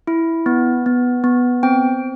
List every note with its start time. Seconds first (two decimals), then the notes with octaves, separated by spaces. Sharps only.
0.07 E4
0.46 B3
0.86 B3
1.24 B3
1.63 C4 G5